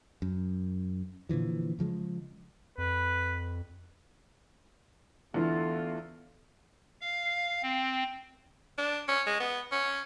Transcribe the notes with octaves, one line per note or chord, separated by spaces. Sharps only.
F#2
A#2 D3 E3 F3
C#3 F3 F#3 G#3
F2 B4
E2 D3 E3 A3 B3 F4
F5
C4
D4
C#4
G#3
B3
C#4